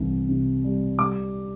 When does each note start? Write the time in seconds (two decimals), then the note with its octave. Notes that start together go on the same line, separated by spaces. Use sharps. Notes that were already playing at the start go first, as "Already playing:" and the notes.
Already playing: C2 E3
0.29 C3
0.64 G3
0.99 G3 D6